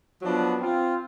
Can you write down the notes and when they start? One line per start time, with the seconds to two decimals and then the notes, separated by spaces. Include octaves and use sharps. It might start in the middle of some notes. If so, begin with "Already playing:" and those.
0.22 F3 F#3 B3 D4
0.60 C4 F4